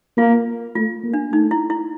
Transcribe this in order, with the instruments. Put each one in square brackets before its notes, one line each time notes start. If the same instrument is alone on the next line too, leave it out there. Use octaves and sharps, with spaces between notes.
[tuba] A#3 [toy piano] F4
[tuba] A3 [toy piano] F4
[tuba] A#3
[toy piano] D4
[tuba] A3 [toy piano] D#4
[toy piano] E4
E4